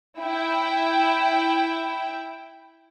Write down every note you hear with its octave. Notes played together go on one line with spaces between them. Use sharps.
E4 G5